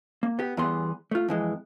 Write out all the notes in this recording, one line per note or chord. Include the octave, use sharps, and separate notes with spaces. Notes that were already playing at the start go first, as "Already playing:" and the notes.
A#3
B3 G4
E2 E3 G3 B3 G#4 C6
A3 F4
F2 E3 G#3